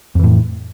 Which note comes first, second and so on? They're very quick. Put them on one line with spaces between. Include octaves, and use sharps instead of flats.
F2 E3 A2